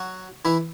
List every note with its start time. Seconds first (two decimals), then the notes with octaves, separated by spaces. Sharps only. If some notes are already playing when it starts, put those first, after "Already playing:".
Already playing: F#3 F#4
0.45 E3 E4